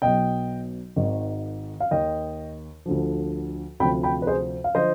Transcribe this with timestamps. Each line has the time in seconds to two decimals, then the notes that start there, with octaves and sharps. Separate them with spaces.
0.02 B1 B2 D#5 G5
0.96 G#1 G#2 D#3
1.80 F5
1.91 D#2 D#3 D#5 G5
2.86 D2 D3 F3
3.80 D2 C3 F3 G5 B5
4.03 G5 B5
4.22 B4
4.27 G#4 C5
4.64 F5
4.75 D3 F3 C5 D#5